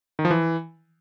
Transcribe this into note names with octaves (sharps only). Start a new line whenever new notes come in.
D#3
F3
E3